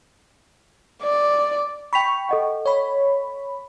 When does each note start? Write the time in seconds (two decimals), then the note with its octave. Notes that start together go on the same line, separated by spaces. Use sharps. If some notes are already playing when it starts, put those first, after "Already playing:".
1.03 D5
1.93 G5 B5 C#6 B6 F7
2.29 A4 D#5 F#5
2.66 C#5 B5